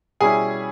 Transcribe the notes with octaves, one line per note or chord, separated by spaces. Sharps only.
B2 G3 C#4 E4 G#4 G#5